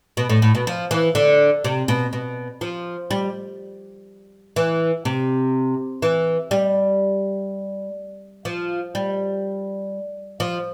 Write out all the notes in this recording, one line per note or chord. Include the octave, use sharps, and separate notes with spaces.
B2
A2
A2
B2
F3
E3
D3
C3
B2
B2
F3
G3
E3
C3
E3
G3
F3
G3
F3